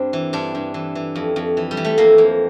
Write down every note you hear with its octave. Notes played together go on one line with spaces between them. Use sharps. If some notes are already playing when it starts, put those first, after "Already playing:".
Already playing: G2 C4 D4
E3
G2 D4
G2
E3
E3
F2
F2
E3
G3
E3
A3
F2 A#3
F2